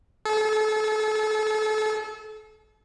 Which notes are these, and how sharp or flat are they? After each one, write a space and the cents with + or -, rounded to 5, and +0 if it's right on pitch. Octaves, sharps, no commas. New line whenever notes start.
A4 -35